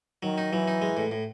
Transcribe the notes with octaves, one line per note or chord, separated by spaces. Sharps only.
D#3 F#3
D#4
E3 F#3
D#4
G#3
A2
A2